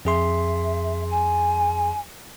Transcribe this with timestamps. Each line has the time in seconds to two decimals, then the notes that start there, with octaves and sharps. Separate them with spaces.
0.05 F2 G#4 E5 C6
1.10 G#5